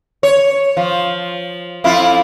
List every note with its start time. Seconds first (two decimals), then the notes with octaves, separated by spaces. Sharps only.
0.23 C#5
0.77 F3
1.84 F2 E4 F4